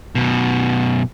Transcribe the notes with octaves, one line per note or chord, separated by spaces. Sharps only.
F#2 B2